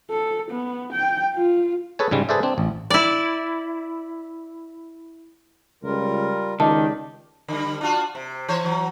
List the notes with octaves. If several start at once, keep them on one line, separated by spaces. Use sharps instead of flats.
A4
B3
G5
F4
G#4 A4 B4 C#5 G#5
G#2 C#3 G3 G#3
G#4 A4 B4 C5 D5 E5
C4 D4
A1
E4 D5
C#2 G3 F4 A#4
C#2 D#3 G4 D5 A5
D3 G3
D4 F4 F#4
C3
E3 C5 C#5
E3 F#3